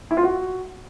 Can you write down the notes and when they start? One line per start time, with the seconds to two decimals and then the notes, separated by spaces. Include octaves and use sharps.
0.11 E4
0.17 F4
0.23 F#4